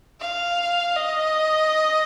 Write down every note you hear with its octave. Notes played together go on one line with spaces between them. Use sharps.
F5
D#5